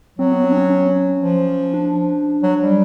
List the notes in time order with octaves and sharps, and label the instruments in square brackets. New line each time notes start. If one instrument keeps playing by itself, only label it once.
[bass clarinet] F#3 [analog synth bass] C4
[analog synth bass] B3
C4
D4
C#4
C#4
[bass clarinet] F3
[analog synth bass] D4
[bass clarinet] F#3
G3